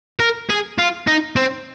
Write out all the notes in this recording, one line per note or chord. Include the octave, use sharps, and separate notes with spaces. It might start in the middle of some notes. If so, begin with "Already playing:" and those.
A#4
G#4
F4
D#4
C4